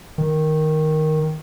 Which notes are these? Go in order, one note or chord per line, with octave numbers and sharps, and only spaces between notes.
D#3